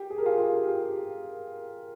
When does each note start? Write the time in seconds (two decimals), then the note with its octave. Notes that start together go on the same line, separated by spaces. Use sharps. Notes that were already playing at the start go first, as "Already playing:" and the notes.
Already playing: G4
0.10 G#4
0.18 A#4
0.26 F4 G#4
0.38 G4
0.67 G4